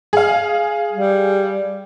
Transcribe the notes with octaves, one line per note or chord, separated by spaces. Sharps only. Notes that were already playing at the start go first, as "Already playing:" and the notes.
G#4 F5
G3